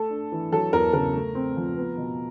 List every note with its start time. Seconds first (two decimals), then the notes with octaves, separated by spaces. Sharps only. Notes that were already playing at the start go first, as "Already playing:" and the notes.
Already playing: A3 A4
0.10 D4
0.32 E3
0.52 F#3 A4
0.73 E2 A#4
0.93 C#3 A#4
1.14 A3
1.35 C4
1.56 F3
1.77 B3
1.98 B2